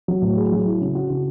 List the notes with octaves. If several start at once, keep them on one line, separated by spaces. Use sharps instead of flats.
F#3
A2
G#4
F#3
E4
C#3
F#4
C#3